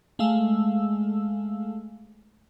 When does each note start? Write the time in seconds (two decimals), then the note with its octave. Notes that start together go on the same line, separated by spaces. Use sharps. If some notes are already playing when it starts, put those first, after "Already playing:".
0.19 G#3 A3 F5 E6